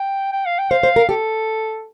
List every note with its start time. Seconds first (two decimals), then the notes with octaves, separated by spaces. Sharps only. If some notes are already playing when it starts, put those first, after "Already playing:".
Already playing: G5
0.33 G5
0.46 F5
0.58 G5
0.70 C5 F5
0.83 C5
0.96 A#4
1.09 G4 A4